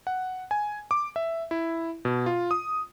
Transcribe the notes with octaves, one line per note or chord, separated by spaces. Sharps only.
F#5
G#5
D6
E5
E4
B2
F4
D#6